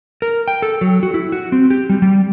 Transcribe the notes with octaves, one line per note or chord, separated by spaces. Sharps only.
A#4
G5
A4
F#3
F#4
E4
F#4
C4
G4
G3
G3